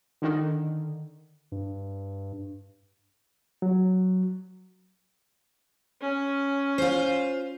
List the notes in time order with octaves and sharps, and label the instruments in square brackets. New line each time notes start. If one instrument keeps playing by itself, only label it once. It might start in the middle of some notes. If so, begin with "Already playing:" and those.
[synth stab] D3 D#3
[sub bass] G2
[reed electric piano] F#3
[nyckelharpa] C#4
[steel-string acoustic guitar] F4 C5